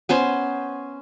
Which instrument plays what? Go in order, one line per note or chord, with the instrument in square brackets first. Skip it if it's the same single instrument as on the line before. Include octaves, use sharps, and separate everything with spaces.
[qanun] B3 C#4 C5 C6